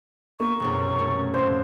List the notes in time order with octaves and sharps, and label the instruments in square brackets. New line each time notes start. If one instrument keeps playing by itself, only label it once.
[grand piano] A#3 [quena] C#6 [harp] E7
[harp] E1 C2 F#2
A3 C#4
[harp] F2 A2 [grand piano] C5 [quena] C6